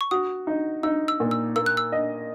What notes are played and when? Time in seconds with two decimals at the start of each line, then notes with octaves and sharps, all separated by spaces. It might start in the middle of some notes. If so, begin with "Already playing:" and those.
0.01 C#6
0.11 F#4 D#6
0.47 D#4
0.83 D#4 E6
1.08 E6
1.20 A#2
1.31 E6
1.56 A#3 E6
1.66 F#6
1.77 E6
1.92 D#5